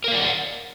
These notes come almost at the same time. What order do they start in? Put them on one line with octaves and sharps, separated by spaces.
A#4 F5 D5 F#5